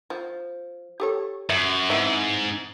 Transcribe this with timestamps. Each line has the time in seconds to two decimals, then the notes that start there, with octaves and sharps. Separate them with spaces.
0.10 F3
1.00 G4 A4 C#5
1.49 F#2 E5
1.90 G#2 E3 C4 E5